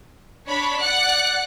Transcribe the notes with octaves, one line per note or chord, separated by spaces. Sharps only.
D4 C#5 B5
D5 F#5 F#6 C#7